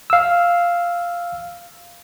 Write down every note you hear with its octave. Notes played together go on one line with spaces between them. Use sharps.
F5 E6